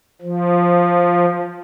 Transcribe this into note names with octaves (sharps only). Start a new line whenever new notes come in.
F3